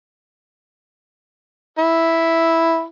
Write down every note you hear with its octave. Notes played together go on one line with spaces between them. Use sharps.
E4